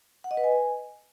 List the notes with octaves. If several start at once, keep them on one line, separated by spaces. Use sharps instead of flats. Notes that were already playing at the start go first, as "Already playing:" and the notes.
F#5
D#5
B4
G#5